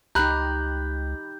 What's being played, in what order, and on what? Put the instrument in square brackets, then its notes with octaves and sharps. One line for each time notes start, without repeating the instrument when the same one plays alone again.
[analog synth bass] C#2 [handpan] D#4 G4 [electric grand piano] A#5 B5 F#6 [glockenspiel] G6